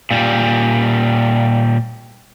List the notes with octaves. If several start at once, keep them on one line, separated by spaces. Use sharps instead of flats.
A#2 G3